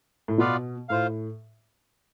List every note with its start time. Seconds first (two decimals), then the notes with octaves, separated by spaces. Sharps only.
0.28 A2
0.38 B2 B3 F4 B4 D5 F5
0.89 A2 F4 C5 F5